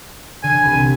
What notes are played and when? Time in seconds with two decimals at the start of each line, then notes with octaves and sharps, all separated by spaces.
0.43 D3 G#5
0.63 C2 B5